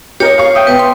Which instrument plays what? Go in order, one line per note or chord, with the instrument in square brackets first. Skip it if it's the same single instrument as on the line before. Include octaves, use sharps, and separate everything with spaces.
[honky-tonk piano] G4 A#4 D#5 [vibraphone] C#5
[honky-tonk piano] F5 C#6
[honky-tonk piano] E5 [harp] G5 D#6
[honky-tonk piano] B2 [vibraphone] B4
[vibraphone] C6